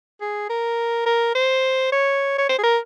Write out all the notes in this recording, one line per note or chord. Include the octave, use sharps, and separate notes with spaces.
G#4
A#4
A#4
C5
C#5
C#5
C5
G#4
A#4